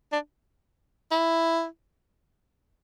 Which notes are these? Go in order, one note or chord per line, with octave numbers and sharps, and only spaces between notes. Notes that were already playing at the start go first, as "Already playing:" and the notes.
D4
E4